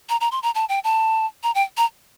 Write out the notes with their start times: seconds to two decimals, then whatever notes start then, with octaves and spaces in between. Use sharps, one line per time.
0.09 A#5
0.21 A#5
0.32 C6
0.43 A#5
0.55 A5
0.69 G5
0.84 A5
1.43 A#5
1.55 G5
1.77 A#5